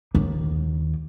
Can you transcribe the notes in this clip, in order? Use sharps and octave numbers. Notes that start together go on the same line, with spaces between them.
D#2